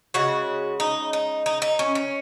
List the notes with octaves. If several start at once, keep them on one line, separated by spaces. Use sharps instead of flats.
C#3 G#3 F#4
D#4
D#4
D#4
D#4
C#4
C#4